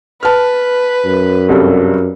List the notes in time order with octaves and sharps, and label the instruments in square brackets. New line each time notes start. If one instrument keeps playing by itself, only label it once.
[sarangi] B4 [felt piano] A5 F6
[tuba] F#2
[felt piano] C2 G2 A4